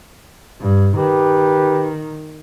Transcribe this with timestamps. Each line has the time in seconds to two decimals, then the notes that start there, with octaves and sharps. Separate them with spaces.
0.61 G2
0.97 D#3 G4 B4